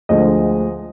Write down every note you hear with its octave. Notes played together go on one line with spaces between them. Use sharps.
D2 D3 F3 G#3 D#5